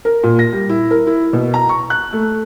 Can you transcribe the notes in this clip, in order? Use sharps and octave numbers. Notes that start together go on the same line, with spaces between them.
A#4
A#2
A#6
G3
E4
A#4
E4
B2
A#5
C#6
F#6
A3